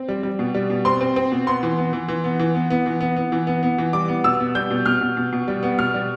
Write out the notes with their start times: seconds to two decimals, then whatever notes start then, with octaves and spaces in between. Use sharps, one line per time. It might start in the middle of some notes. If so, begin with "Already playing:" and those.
Already playing: C4
0.08 G3
0.23 G3
0.39 B2
0.54 G3
0.70 B2
0.85 C4 C6
1.01 C4
1.16 C4
1.32 B2
1.47 B3 C6
1.63 E3
1.78 B3
1.93 E3
2.08 E3
2.24 B3
2.39 E3
2.55 B3
2.70 B3
2.86 E3
3.01 B3
3.16 B3
3.32 E3
3.47 B3
3.63 B3
3.78 E3
3.93 G3 D6
4.08 B3
4.24 B2 E6
4.40 B3
4.55 G3 G6
4.71 B2
4.86 B2 F6
5.01 B2
5.17 B2
5.33 B2
5.48 G3
5.63 B3
5.78 B2 F6
5.94 G3